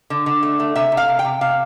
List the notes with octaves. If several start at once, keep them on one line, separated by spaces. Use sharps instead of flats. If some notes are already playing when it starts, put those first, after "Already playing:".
D3
D3
A3
A3
C3 E5
C3
F5
C3
G5
C3
C3 F5